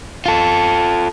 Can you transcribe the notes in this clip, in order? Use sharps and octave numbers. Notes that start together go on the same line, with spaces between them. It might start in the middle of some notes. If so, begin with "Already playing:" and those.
F4 A4